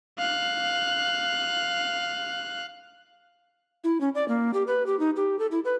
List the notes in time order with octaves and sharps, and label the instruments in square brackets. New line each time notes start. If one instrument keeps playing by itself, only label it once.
[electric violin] F5 F#6
[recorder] E4
C#4
D5
A#3
G4
B4
G4
D#4
G4
A4
E4
B4